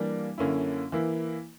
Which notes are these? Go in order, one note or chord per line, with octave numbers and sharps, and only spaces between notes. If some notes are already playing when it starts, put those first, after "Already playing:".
Already playing: E3 G3 A#3 D4
F#2 D3 A#3 C#4 E4
E3 A#3 E4